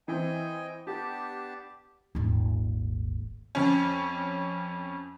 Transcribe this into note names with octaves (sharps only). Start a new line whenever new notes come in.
E3 C4 D#5 G5 G#5
B3 D4 G4 A5
D#1 G#1
F2 C#4